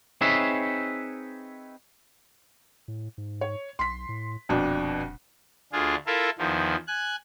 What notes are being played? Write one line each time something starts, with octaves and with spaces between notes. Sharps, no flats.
C4 D#4 G#4 B4 C#5 E5
A2
G#2
C#5
B1 C6 B6
A2
D#1 F2 B2 D4
D2 D4 F4 G#4
E4 F4 A4 A#4 E5
E2 D#3 F3
G#5 F#6